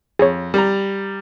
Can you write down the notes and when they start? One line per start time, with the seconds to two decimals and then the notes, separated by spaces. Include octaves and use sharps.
0.19 F2 G#4 C#5
0.54 G3 A#5